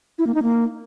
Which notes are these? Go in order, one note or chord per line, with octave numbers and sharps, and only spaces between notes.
E4
A#3
D#4
A#3